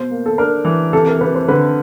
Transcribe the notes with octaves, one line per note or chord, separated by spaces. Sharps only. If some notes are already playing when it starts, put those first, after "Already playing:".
Already playing: B2 C5
A#3
A4
D4 A#4
E3
C3 A4
A#4
C3 B4
C5
D3 B4